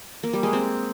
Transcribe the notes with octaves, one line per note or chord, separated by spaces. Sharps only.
A#3
G3
G#3
C4